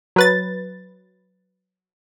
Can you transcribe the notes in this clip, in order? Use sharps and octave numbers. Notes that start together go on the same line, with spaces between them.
F#3 B4 A6